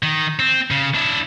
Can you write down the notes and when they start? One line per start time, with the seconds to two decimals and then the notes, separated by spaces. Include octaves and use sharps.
0.03 D#3
0.39 C4
0.71 C#3
0.95 D4 E4